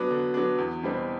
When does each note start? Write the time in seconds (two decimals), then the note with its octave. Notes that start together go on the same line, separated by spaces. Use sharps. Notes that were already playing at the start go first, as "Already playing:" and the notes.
Already playing: F#3 B3 D4
0.11 D3
0.34 F#3 B3 D4
0.58 E2
0.83 B2 G3 C4